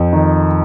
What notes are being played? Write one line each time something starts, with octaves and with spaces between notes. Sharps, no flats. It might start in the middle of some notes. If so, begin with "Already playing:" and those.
Already playing: F2
D#3